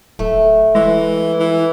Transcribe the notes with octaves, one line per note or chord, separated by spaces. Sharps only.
D1 A3
E3 G#3
E3